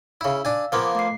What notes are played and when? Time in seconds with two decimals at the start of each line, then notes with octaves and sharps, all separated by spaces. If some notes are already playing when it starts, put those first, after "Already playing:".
0.21 C#3 E4 F5 E6
0.45 D4 G#5
0.72 F3 A#3 B3 F5 D6 G#6
0.95 A3 C7